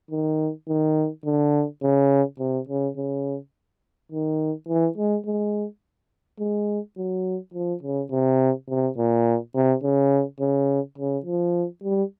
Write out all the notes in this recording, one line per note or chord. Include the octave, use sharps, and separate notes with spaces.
D#3
D#3
D3
C#3
C3
C#3
C#3
D#3
E3
G#3
G#3
G#3
F#3
F3
C#3
C3
C3
A#2
C3
C#3
C#3
C#3
F3
G3